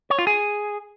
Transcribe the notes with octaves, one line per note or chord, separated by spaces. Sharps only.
C#5
F4
G#4